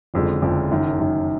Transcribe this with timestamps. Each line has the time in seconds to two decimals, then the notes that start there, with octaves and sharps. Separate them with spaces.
0.14 F#1 F2 D3 F3 G#3
0.42 F#1 F2 D3 F3 G#3
0.71 F#1 F#2 D#3
0.99 F#1 F#2 D#3